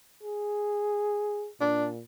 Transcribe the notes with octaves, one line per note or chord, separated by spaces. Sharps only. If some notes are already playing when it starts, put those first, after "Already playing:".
G#4
A#2 D4